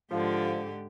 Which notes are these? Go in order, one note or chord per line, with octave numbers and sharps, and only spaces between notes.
G#2 D3 F3 G4